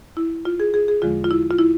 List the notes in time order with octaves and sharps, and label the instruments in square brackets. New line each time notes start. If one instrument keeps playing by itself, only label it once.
[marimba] E4
F4
G#4
G#4
G#4
E2 D3 F3 G#3 F4
F4
E4
F4
E4